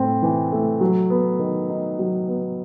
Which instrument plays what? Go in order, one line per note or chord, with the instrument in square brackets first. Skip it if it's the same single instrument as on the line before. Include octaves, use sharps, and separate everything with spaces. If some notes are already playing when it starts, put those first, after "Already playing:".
Already playing: [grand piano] A2 C4
E3
A3
F#3
B3
D#3
D#4
F#3
B3